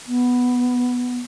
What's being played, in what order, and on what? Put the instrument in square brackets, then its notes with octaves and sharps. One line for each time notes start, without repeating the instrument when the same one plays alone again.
[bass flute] B3